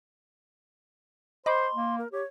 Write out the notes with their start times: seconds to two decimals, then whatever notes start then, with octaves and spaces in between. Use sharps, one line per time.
1.46 C5 D#5 B5 C6 D6
1.74 A#3
1.98 A#4
2.12 G4 C#5